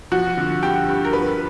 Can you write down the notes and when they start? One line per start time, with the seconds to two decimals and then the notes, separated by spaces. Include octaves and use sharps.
0.12 F3 F#4
0.37 D3
0.63 G2 G4
0.88 G2
1.05 A#4
1.13 F3 B4